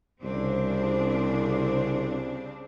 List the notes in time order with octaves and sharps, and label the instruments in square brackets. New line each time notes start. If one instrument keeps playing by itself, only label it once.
[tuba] C2 [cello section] C#3 C4 D4